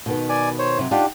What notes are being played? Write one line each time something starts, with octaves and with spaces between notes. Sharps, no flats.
B2 D#3 B3
D5 G#5
C5 C#5
C3 F#3
D4 D#4 F4 G4 F#5